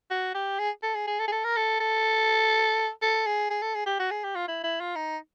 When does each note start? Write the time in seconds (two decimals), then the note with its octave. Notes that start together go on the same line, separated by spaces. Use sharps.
0.11 F#4
0.35 G4
0.59 G#4
0.83 A4
0.95 G#4
1.07 G#4
1.20 A4
1.28 G#4
1.32 A4
1.44 A#4
1.56 A4
1.80 A4
3.02 A4
3.26 G#4
3.50 G#4
3.62 A4
3.75 G#4
3.86 G4
4.00 F#4
4.11 G#4
4.24 G4
4.35 F4
4.48 E4
4.64 E4
4.81 F4
4.96 D#4